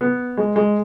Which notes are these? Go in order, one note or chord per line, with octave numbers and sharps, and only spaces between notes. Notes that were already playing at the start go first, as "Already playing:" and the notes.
B3
G#3
G#3